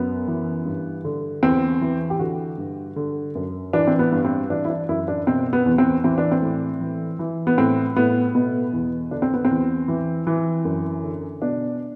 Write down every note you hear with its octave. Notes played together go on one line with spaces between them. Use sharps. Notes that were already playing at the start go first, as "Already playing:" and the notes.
Already playing: F#2 B3
E3
G2
D3
E2 C4
E3
G4
D3 F#4
G2
D3
F#2
E3 D4
C4
B3
G2
C4
E3 D4
E4
D4
F#2 E4
D4
B2 C4
B3
E2
C4
E3 C4
D4
C4
A2
E3
E3
B3
A2 C4
A2 B3
B2 B3
E2
D3 D4
C4
B3
C4
E2
E3
E3
F#2
D3
B2 D4